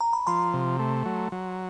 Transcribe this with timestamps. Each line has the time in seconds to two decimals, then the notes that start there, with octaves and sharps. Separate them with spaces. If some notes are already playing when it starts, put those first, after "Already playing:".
0.01 A#5
0.13 B5
0.27 F3 A#5 C6
0.54 C3
0.79 A3
1.06 F#3
1.32 F#3